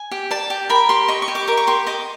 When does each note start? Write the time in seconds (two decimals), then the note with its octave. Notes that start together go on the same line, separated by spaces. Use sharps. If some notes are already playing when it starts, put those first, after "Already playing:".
Already playing: G#5
0.11 G4
0.31 D5 A5
0.50 G4
0.69 A#4 B5
0.89 G4 C6
1.08 D#5 C#6
1.22 C#6
1.28 G4
1.35 D6
1.48 A#4 D6
1.57 C#6
1.67 G4 C6
1.87 D#5 D6